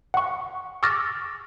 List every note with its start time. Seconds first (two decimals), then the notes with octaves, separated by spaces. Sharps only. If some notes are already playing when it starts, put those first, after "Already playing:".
0.14 F#5 C#6
0.83 C#6 D6 E6 F6 A6 A#6